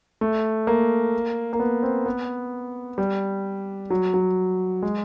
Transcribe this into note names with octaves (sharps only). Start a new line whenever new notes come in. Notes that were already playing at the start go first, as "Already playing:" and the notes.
A3
A#3
A#3
B3
C4
B3
G3
F#3
F#3
G#3